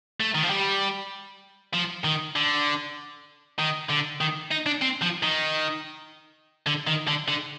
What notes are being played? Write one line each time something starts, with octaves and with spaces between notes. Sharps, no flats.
A3
D#3
F3
G3
F3
D#3
D3
D#3
D3
D#3
D#4
D4
C4
F3
D#3
D3
D#3
D3
D3